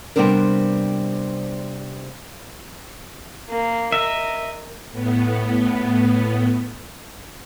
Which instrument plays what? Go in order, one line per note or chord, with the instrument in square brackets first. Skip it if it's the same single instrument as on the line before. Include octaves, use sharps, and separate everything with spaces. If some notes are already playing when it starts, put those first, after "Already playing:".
[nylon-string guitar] C3 G3 B3 C4 D4 A#4
[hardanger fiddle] A#3
[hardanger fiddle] A#4 D#5 [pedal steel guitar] E5
[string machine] A2 B3